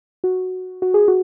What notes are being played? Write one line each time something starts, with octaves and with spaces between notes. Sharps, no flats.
F#4
F#4
G#4
F#4